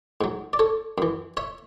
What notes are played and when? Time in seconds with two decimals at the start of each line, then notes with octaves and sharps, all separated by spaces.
0.21 G#2 F#3
0.53 D5
0.59 A4 C#5
0.98 F#2 E3
1.37 C#5 E5